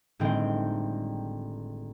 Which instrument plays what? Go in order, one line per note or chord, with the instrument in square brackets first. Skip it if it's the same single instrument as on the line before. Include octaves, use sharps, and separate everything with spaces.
[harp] G1 A2 D#3 G#3 C4 G5